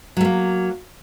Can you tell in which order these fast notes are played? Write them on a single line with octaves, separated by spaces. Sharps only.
F#3 A3 A#3